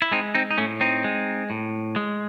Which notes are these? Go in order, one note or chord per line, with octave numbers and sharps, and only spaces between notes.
E4
G#3 C4 D#4
C4 D#4
D#4
A2 A3 C#4
C4 D#4
G#3
A2
G#3